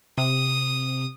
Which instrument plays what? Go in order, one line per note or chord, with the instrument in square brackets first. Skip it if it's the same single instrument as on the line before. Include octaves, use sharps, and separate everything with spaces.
[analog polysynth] C3 [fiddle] D#6